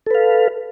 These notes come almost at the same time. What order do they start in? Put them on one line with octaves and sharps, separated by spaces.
A4 B4 F5